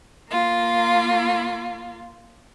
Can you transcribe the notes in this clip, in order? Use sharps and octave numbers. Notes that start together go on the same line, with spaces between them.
A#3 F4